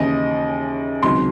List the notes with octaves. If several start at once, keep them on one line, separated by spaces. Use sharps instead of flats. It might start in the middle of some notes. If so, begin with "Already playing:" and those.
Already playing: D#2 C#3 E3 D#5
C#2 C3 D#3 F#3 C6